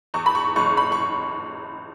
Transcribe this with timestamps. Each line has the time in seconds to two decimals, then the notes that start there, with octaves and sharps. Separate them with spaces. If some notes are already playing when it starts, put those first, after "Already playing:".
0.14 E2 C#6
0.26 B5
0.35 C#6
0.56 F#1 C#6
0.77 B5
0.92 C#6